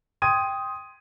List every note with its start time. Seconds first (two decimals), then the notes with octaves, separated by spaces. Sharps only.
0.22 G5 C6 D#6 G#6 D#7